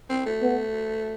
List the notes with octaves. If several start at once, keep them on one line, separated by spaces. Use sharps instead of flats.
C4
A3
B3